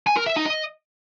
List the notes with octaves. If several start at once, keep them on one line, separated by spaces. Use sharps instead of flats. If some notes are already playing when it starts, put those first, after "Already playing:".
G#5
A#4
E5
D#4
D#5